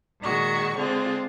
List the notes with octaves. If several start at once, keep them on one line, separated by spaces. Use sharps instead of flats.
A#2 D#3 G#3 F#4 C#6
D3 G#3 C4 F4